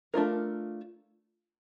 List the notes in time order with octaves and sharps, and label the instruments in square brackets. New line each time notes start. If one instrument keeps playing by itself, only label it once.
[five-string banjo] A3 D4 F4 A#4